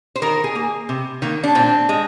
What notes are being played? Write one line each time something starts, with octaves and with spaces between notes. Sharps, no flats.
C5
D#3 A#4
G#4
A#3
C3
D#3 A#3
D4
A#2 C4
G#3